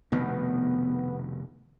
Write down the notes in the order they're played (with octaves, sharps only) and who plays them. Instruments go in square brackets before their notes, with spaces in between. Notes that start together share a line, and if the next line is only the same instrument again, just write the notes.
[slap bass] F1 B2 D#3 [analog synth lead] B3